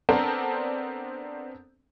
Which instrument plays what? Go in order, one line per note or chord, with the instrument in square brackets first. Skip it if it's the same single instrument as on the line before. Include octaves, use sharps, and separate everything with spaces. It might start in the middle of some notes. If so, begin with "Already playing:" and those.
[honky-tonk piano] B3 C4 D4 A4 A#4 C5